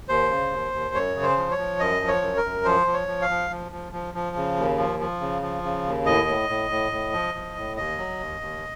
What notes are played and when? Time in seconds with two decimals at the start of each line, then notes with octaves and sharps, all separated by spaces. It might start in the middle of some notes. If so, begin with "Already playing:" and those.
0.09 D#2 C5
0.31 C#3
0.52 D#2
0.73 D#2
0.95 F#2 C#5
1.16 C#3
1.23 C5
1.37 F3
1.51 C#5
1.58 F3
1.79 F#2 D#5
2.01 F3
2.08 C#5
2.22 F#2
2.37 A#4
2.44 F#2
2.65 F3 C5
2.87 F3
2.94 C#5
3.08 F3
3.22 F5
3.30 F3
3.50 F3
3.72 F3
3.92 F3
4.14 F3
4.36 C#3
4.57 D#2
4.78 F3
4.99 F3
5.21 C#3
5.42 F3
5.63 C#3
5.85 D#2
6.06 A2 D#5
6.28 A2
6.49 A2
6.70 A2
6.92 A2
7.13 F3
7.34 F3
7.56 A2
7.77 D#2 D#5
7.98 F#3
8.20 D#2
8.41 D#2